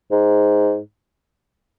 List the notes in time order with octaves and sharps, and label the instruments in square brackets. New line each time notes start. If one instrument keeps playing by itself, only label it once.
[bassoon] G#2